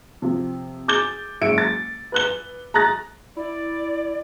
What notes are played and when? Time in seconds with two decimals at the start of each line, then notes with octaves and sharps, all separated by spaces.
0.22 C3 F3
0.88 G#4 D6 G6 A6 G7
1.41 F#1 G#3 E5 C#7 D7
1.58 A6
2.12 B4 F#6 G7
2.74 A#5 D#6 F#6 A6 A#6
3.36 E4 D5